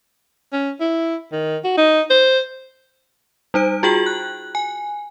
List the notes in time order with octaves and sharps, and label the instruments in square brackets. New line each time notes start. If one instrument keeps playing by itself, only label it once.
[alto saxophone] C#4
E4
D#3
F#4
D#4
C5
[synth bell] G3 D#4 C5 D7
F4 F#4 G#4 G5 F#7
F#6
G#5